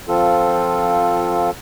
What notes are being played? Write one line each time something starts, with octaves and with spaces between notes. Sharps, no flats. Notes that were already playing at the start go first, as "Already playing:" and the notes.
F3 C4 F4 A4